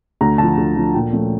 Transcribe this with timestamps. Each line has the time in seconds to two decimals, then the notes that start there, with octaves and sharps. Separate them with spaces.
0.21 D2 A#5
0.38 D3 F3 A5
0.58 D2
0.76 D3 F3
0.94 A#2 G5
1.12 F3 A3 C#4